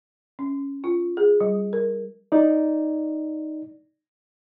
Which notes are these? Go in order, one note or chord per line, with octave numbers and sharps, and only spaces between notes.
C#4
F4
G#4
G3
A#4
D#4 D5